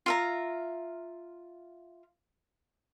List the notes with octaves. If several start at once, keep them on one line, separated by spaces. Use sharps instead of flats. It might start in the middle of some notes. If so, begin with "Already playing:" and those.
F4 E5 A#5